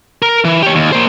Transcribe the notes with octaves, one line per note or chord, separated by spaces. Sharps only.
A#4
E3
G4 C#5
D#2
A#3 C5